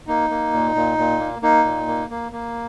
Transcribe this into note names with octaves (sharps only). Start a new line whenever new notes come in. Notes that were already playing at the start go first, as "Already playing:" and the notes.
A#3 D#4
A#3
A#2
A#2
A#2
A#3
A#3 D#4
A#2
A#3
A#3
A#3